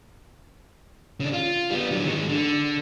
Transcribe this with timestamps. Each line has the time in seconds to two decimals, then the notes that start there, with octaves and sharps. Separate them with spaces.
1.20 C#3 D4
1.33 F4
1.71 G3 B3
1.91 D3 F#3
2.06 D#3 G#3
2.29 D3